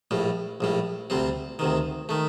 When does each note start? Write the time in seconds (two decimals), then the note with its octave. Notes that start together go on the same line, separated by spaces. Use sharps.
0.11 A#1 A2 G3
0.61 A#1 A2 G3
1.10 D2 C3 G3 C4
1.59 D2 C3 D#3
2.09 D#3 A3